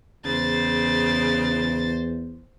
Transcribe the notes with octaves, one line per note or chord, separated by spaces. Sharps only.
E2 C#3 C5 A6